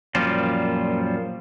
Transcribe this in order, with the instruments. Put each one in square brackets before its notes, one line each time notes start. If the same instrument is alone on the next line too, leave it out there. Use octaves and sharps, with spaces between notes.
[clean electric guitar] F#2 A#2 F3 G3 F4